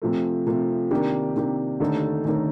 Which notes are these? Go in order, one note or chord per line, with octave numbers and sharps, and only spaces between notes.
C3 F3 A3
C3 F3 A3
C3 D#3 A#3 D4 G4
C3 D#3 A#3 D4 G4
D#2 D3 A3 D#4 A4
D#2 D3 A3 D#4 A4